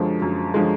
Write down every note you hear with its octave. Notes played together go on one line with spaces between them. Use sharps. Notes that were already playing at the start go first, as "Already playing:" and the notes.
Already playing: F#2 D3 F3 G#3
F#2
D3 F3 G#3